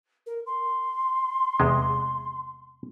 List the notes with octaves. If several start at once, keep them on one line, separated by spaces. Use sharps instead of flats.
A#4
C6
E2 C3 G#3